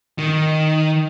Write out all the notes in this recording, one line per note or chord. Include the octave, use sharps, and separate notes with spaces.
D#3